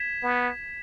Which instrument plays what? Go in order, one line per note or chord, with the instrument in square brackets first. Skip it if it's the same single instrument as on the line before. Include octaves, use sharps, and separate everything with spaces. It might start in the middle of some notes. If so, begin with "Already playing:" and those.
Already playing: [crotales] G#6 B6 E7
[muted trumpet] B3